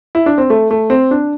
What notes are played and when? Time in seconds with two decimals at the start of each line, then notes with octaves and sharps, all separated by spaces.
0.15 E4
0.26 D4
0.38 C4
0.50 A3
0.71 A3
0.90 C4
1.11 D4